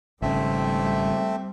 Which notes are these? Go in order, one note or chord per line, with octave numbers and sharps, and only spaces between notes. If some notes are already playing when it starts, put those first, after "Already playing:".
G#1 C#3 G3 A3 C4 E5